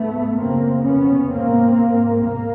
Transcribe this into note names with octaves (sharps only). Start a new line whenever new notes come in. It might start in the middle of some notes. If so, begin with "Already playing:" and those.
Already playing: G#2 A3 B3
F#2 C#3 A#3 C4
F2 C3 B3 C#4
G#2 A#3 C4
G#2
A#3